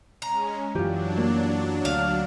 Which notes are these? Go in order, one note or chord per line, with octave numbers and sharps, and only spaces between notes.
G#3 C#4 A#5
F#2 E3 F#3 D4 F4 G4
A#3
D2 F5